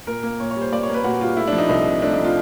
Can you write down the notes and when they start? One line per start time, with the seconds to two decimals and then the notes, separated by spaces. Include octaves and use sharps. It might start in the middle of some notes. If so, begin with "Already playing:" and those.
0.07 A#2 A#4
0.23 A#3
0.40 A#2 C#5
0.51 C#5
0.56 G3
0.61 C5
0.72 A#2 D5
0.83 C#5
0.89 A#3
0.94 B4
1.04 A#2 F#4
1.21 G3 F4
1.37 A3 E4
1.47 D4
1.53 F3
1.58 D#4
1.69 C2 D#4
1.86 C3
2.02 A3 D4
2.13 D#4
2.18 F3
2.24 F4